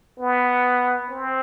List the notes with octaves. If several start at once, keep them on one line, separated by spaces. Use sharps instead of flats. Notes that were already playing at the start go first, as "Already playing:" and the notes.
B3
C4